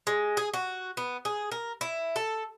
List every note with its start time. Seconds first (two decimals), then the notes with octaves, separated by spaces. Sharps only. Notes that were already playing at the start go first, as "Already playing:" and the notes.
0.07 G#3
0.37 G#4
0.54 F#4
0.97 B3
1.25 G#4
1.51 A#4
1.81 E4
2.16 A4